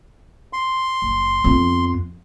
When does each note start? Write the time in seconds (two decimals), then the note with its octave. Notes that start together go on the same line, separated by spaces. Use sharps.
0.53 C6
1.02 F#1
1.44 F2 B3